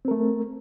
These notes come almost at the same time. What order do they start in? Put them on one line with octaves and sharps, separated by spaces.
C4 A#4 A3